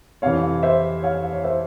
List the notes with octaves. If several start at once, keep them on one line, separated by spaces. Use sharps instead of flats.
F2 C3 E3 C#5 F5
C5 E5
C#5 F5
C#5
C5 E5